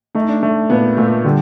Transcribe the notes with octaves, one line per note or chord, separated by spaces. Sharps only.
A3 D#4
D4
A3 D4
A#2 B3
A#2 A3
D3 G3